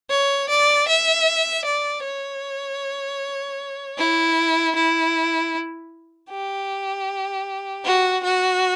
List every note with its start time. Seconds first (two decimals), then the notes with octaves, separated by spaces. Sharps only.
0.10 C#5
0.50 D5
0.88 E5
1.65 D5
2.04 C#5
3.98 E4
4.75 E4
6.30 G4
7.85 F#4
8.24 F#4